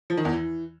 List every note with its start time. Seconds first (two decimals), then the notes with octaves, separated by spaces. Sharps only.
0.10 F3
0.17 D#3
0.25 E2
0.33 E3